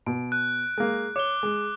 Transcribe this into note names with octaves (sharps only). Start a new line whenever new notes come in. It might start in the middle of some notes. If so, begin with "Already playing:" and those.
B2 D7
F#6
G#3 A#3
C#5 D6 G7
G#3